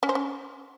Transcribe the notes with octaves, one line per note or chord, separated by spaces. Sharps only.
C#4
C5
C#4